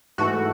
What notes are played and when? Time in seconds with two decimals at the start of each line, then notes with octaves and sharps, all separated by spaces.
0.18 G#2 E3 A3 F#4